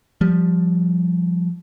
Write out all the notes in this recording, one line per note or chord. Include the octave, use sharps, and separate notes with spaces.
F3 G3